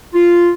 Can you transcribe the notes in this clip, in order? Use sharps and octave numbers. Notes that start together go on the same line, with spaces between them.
F4